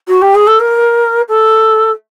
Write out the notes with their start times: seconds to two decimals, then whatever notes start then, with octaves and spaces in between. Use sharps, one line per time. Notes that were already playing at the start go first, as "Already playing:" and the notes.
0.08 F#4
0.22 G4
0.35 G#4
0.47 A4
0.60 A#4
1.29 A4